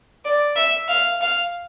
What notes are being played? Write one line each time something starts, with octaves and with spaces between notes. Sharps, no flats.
D5
E5
F5
F5